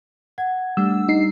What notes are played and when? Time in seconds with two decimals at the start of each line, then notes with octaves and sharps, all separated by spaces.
0.38 F#5 G#6
0.77 G3 A3 D4 E6
1.08 D#4 C7